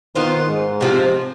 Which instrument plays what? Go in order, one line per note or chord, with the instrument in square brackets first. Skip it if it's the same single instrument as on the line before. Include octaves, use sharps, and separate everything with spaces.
[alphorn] D#3 [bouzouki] B3 F4 C5
[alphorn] G#2
[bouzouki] C3 F3 C4